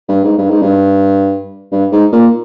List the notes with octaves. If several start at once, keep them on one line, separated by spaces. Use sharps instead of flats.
G2
G#2
G2
G#2
G2
G2
G#2
A#2